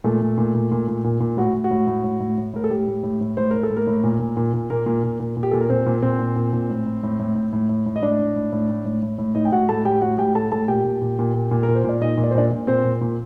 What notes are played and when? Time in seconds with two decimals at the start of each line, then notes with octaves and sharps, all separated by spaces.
0.04 A#2 A3 A4
0.22 A#2
0.38 A#2
0.55 A#2
0.71 A#2
0.88 A#2
1.04 A#2
1.20 A#2
1.37 A2 F#4
1.54 A2
1.64 F#4
1.71 A2
1.87 A2
2.04 A2
2.20 A2
2.38 A2
2.54 A2 A#4
2.64 A4
2.70 A2 G4
2.87 A2
3.03 A2
3.21 A2
3.37 A2 C5
3.51 A2 A#4
3.63 A4
3.70 A2
3.77 A#3 A#4
3.87 A2
4.04 A#2
4.19 A#2
4.37 A#2
4.54 A#2
4.70 A#2 A#3 A#4
4.86 A#2
5.04 A#2
5.20 A#2
5.37 A#2
5.43 G4
5.51 A#2 A4
5.61 A#4
5.69 A#2 C4 C5
5.86 A#2
6.02 A#2 C4 C5
6.19 A#2
6.36 A#2
6.53 A#2
6.70 A2
6.86 A2
7.03 A2
7.19 A2
7.35 A2
7.53 A2
7.69 A2
7.86 A2
7.96 D#5
8.02 A2 D4 D5
8.19 A2
8.36 A2
8.52 A2
8.69 A2
8.85 A2
9.03 A2
9.18 A2
9.35 A2 D#4 D#5
9.45 G5
9.52 A2 F#4 F#5
9.69 A2 A4 A5
9.85 A2 G4 G5
10.01 A2 F#4 F#5
10.18 A2 G4 G5
10.35 A2 A4 A5
10.52 A2 A4 A5
10.68 A#2 G4 G5
10.84 A#2
11.01 A#2
11.19 A#2
11.34 A#2
11.51 A#2
11.63 A#4
11.68 A#2
11.75 C5
11.84 A#2 D5
12.01 A#2 D#4 D#5
12.17 A#2
12.24 D5
12.31 C5
12.35 A#2 D4 D5
12.51 A#2
12.67 A#2 C4 C5
12.84 A#2
13.01 A#2